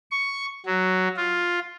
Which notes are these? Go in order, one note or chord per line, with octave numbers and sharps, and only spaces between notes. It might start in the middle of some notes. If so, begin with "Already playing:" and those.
C#6
F#3
F4